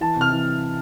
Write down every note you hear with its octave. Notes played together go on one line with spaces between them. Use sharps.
E3 A5
C3 F6
E3